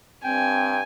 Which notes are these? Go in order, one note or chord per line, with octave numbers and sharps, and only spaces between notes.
G2 C4 G5 G#5